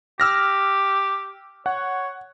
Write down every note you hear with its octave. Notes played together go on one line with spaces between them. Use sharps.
G4 E6 F6 A#6
C#5 F#5